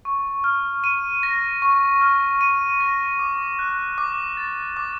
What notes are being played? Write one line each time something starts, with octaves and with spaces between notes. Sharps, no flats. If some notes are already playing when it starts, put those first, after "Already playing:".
C#6
F6
D#7
A#6
C#6
F6
D#7
A#6
D6
F#6
D6
A6
D6